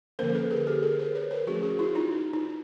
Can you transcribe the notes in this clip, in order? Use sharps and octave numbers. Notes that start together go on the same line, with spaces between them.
D3 F3 A#3 C#4 A#4 C5
A4 B4
G#4 A#4
G4 A4
G#4 A#4
A#4 C5
B4 C#5
A#4 C5
F3 A3 C#4 F#4 G#4
F#4 G#4
E4 F#4
D#4 F4
D#4
D#4